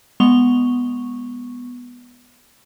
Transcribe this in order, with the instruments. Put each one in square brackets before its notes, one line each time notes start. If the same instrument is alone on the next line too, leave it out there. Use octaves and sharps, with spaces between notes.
[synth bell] G#3 B3 C#6 F7 G7